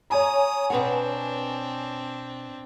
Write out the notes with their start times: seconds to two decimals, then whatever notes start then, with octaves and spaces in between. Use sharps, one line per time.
0.10 C#5 G#5 A#5 D#6
0.70 B2 C4 D4 B4 F#5